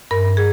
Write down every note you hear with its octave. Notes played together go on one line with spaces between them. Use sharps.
G2 A#4
G#4